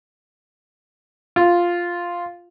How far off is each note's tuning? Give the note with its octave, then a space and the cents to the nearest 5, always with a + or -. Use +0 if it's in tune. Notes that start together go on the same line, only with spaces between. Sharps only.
F4 +0